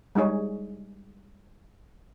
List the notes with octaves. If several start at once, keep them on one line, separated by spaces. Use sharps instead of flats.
G3 G#3 D#4 G#4 C#5